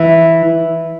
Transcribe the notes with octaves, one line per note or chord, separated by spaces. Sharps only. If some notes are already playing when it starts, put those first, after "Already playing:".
Already playing: E3